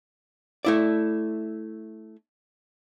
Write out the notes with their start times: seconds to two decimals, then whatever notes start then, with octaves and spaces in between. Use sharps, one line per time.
0.65 A3 E4 D5